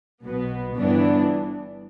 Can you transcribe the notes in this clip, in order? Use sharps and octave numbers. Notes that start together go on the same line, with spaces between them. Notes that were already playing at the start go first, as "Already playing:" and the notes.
B1 B2 B3
G1 G2 E3 B3 D4